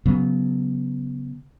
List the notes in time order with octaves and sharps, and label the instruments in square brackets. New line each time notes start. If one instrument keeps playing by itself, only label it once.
[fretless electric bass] C#3 F#3 B3